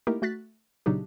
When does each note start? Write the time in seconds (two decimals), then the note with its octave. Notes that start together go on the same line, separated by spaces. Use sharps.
0.07 A3 A#3 D#4 E4 G4 A#4
0.22 A3 F#4 F#6 A6 B6
0.86 A#2 C#3 F#3 D4 D#4 G4